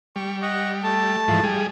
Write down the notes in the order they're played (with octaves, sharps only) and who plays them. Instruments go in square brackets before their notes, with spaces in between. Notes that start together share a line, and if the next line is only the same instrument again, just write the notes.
[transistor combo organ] G3 [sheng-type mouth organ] C#6
[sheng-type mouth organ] D#5 F#5 C#6
A3 A5
[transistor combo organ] G#2 E3 F3
G3 G#4